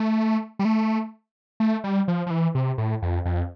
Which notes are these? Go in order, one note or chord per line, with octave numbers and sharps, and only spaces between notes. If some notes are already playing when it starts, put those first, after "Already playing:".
Already playing: A3
G3
A3
A3
G3
F3
F3
E3
C3
A2
F2
F2